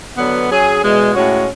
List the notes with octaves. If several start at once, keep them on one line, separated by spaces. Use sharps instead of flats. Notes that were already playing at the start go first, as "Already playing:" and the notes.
D3 F#3 B3
F#3 C#4 G#4
E2 B2 G#3
A2 G#3 C#4 F#4